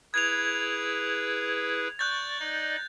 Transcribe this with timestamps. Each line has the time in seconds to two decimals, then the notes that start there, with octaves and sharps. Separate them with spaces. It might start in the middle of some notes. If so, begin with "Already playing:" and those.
0.14 E4 G#4 B4 G#6 F7
1.99 D5 C#6 F#6 G6 A6
2.40 D#4 D5 D#5